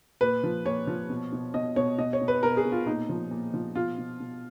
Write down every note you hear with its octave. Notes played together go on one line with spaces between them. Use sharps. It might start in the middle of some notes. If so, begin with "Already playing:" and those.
A#2 B4
F3
A#2 C#5
F3
B2
B2
B2 D#5
B2 C#5
B2 D#5
C#5
B2
B4
B2 A#4
G#4
B2
F4
A#2 D#4
F3
A#2
F3
B2 F4
B2
B2